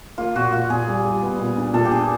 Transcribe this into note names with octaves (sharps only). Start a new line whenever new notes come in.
A#3 F4
A#2 F#4
A#2 F4
A#2 G#4
G3
G3
B3
A#2
D4
A#2 A4
G4
D4 G#4